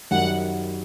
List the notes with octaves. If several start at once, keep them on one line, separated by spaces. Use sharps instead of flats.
F#2 D#3 G3 F#5